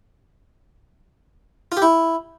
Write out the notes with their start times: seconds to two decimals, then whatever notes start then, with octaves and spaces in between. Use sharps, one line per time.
1.72 F4
1.77 G4
1.82 E4